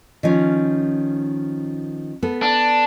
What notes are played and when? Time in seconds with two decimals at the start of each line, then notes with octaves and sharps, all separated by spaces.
0.23 D#3 F3 C#4
2.23 B3 A4
2.42 D4